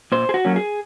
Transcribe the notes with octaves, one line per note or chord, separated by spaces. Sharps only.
A#2 C5
G#4
F#4
F#3 A#3 C#4
G#4